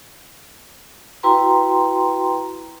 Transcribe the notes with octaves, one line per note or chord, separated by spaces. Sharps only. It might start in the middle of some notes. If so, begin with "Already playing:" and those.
E4 F#4 B4 G5 A#5 C6